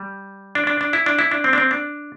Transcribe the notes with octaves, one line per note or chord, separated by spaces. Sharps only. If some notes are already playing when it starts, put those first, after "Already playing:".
Already playing: G3
D4
D4
D4
E4
D4
E4
D4
C4
D4
C4
D4